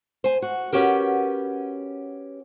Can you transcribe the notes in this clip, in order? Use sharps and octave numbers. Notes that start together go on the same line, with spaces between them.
C5 G#5
F#4
B3 C#4 F#4 G4 A#4